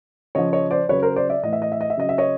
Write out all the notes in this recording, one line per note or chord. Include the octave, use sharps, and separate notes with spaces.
C#3 F3 C#5 D#5
C#5 D#5
C5 D5
C#3 F#3 B4 C#5
A#4 C5
C5 D5
D5 E5
A2 E3 D#5
E5
D#5
E5
D#5
E5
C#3 F#3 D#5
E5
C#5 D#5